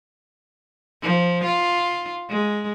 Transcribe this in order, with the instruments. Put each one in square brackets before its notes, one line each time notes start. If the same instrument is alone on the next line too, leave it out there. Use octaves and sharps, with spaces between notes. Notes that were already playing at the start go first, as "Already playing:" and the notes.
[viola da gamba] F3
F4
G#3